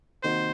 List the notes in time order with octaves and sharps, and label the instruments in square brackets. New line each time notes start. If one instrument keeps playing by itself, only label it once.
[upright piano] C3 D#3 A#3 D#4 F#4 [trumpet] C5